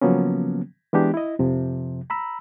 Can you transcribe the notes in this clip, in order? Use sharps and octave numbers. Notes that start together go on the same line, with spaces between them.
C#3 F3 F#3 A#3 B3 C#4
E3 G#3 B3 D4 G4
E4 D#5
F2 C3 F3
A#5 B5 E6